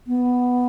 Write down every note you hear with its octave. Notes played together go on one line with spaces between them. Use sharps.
B3